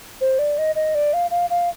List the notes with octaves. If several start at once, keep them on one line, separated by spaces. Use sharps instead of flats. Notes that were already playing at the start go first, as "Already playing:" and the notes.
C5
D5
D#5
D#5
D5
F5
F5
F5